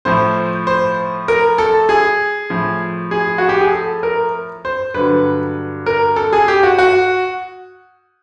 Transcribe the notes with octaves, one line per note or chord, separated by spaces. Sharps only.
A2 F3 C5
C5
A#4
A4
G#4
A2 F3
G#4
F#4
G4
G#4
A4
A#4
C5
G2 D3 F#3 B4
A#4
A4
G#4
G4
F#4
F#4